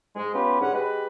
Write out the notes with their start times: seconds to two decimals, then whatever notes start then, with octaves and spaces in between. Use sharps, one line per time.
0.16 G#2 G#3
0.34 B3 C#4 F4 G4 B4
0.60 G#2 D3 C#4 F#5
0.74 G#3 G4 B4